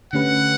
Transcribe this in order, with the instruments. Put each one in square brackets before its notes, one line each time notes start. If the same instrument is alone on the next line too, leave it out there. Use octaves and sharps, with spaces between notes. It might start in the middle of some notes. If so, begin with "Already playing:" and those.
[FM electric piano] D3 A3 C#4 G4 B4 [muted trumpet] F#5